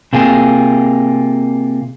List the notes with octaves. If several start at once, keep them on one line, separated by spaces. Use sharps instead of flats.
C3 A#3 F4 G#4